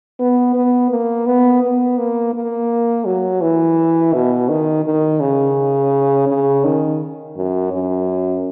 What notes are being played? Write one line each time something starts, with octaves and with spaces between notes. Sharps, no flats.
B3
B3
A#3
B3
B3
A#3
A#3
F#3
E3
B2
D#3
D#3
C#3
C#3
D#3
F#2
F#2